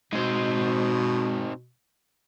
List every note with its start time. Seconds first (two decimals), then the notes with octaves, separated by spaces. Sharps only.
0.13 B2 G#3 C4 D#4 C5